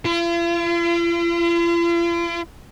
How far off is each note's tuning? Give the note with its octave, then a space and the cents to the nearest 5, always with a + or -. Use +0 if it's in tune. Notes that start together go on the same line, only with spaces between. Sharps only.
F4 -45